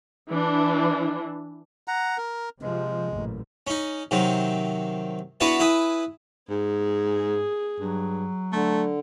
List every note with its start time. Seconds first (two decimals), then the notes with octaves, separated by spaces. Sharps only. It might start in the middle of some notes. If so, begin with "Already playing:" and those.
0.31 E3 D4
1.88 F#5 A#5
2.18 A#4
2.62 C3 F3 G#3
3.11 A1 F#2 A#2
3.67 C#4 D#4
4.11 C3 D#3 F#3
5.40 B3 D4 E4 F#4 B4 C#5
5.60 E4 B4 G#5 D#6
6.50 G#2 G#4
7.80 G2 F#3
8.53 D3 A3